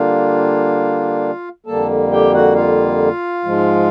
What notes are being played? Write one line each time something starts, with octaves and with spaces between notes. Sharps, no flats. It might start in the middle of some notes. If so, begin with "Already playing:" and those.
Already playing: D3 G3 A#3 D4 F4 F5
F2 D3 G3 A#3 A4 A5
G4 G5
F#4 F#5
F4 F5
G#2 F3 G#3